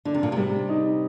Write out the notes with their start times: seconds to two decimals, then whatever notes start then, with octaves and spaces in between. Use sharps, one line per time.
0.05 D3 D4
0.14 C3
0.23 A#2
0.32 C3 G3
0.69 D#4